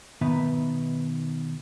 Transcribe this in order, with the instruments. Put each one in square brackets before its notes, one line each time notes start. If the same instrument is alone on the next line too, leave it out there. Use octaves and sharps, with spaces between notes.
[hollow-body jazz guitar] B2 D#3 B3 D#4 B4 E5